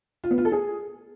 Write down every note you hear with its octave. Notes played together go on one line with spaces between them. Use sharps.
F4
B3
F4
A4
G#4